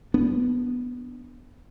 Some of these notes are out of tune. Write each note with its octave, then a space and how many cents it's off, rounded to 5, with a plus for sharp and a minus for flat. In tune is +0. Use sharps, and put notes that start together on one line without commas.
B3 +0 D4 -10